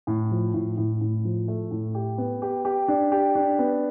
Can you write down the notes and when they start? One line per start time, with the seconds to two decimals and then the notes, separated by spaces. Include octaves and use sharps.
0.07 A2
0.31 F3
0.54 A2
0.77 A2
1.01 A2
1.25 F3
1.48 A3
1.71 A2
1.95 G4
2.18 B3
2.42 G4
2.65 G4
2.88 D4
3.12 G4
3.35 D4
3.59 B3